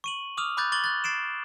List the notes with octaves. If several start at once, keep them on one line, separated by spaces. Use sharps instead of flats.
C#6 D#7 F#7
D6 D#6 F6 F7
B5 D6 F#6 G6 A6
C#6 D6 A6 F#7 G7
F#6 A6
A6 C7 D7 E7